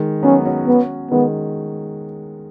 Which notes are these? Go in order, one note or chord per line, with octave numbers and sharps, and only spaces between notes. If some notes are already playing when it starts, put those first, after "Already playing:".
Already playing: D#3 G#3
F#3 B3 C#4
C#4 F#4
B3
D#3 G#3 B3